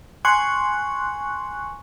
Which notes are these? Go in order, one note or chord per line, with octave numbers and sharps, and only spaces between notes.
G#5 C6 C#6 F#6